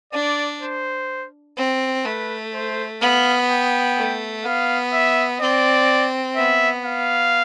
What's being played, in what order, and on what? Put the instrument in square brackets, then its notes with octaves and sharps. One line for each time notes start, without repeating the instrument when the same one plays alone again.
[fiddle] D4 [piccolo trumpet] D5
[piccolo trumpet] C5
[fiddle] C4
[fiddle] A3 [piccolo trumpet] B4
[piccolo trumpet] C5
[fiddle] B3 [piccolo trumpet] F5
[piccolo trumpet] G5
[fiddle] A3
[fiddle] B3 [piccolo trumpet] F5
[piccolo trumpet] E5
[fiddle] C4 [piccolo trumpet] D5
[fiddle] B3 [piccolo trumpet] E5
[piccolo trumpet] F5